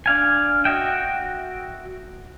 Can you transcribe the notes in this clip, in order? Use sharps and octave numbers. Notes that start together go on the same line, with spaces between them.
D4 F5 G#5
F#4 D#5 E5 G5